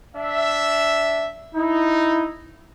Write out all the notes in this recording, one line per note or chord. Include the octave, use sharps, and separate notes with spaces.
D4 E5
D#4 E4